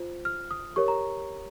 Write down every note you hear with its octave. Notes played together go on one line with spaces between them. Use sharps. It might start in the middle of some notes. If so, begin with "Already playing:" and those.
Already playing: F4 C5
F6
D#6
G4 A#4 C#5 C#6
A#5